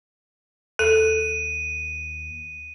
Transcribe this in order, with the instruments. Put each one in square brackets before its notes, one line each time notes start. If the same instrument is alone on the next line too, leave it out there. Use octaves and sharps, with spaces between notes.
[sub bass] D#2 [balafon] A4 [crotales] D#7